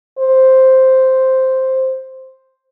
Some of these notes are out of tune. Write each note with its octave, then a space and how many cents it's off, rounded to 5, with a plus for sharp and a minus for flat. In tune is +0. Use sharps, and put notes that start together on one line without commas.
C5 +0